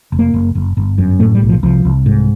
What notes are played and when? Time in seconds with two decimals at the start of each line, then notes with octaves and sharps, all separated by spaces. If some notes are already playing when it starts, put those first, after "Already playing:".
0.12 F1
0.19 A#3
0.34 F#1
0.55 F#1
0.77 G1
0.98 F#2
1.19 A2 A3
1.35 G3
1.42 B1
1.49 F3
1.63 C2 F3
1.85 C2
2.06 G#2